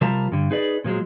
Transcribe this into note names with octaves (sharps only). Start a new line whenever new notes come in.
C3 F3 G3 F4 A#4 A5
G2 D3
D#4 G#4 B4 D5
A#2 F3 F#3 G#3